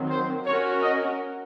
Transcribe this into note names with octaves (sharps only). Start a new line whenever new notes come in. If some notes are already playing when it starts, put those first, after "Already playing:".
Already playing: D#3 F#3 C4
C5
C#4 F#4 A#4 C#5
D#5